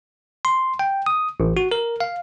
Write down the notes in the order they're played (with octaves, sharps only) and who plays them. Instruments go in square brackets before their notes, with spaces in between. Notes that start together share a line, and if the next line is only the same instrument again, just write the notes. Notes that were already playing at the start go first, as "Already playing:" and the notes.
[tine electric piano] C6
G5
D#6
A1
F#4
A#4
F5